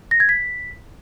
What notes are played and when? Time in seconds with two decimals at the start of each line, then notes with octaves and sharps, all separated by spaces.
0.11 A#6
0.20 G#6
0.29 B6